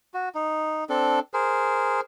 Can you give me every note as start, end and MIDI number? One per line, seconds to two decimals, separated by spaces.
0.14 0.29 66
0.35 0.84 63
0.89 1.19 60
0.89 1.19 62
0.89 1.19 69
1.34 2.01 68
1.34 2.01 70
1.34 2.01 72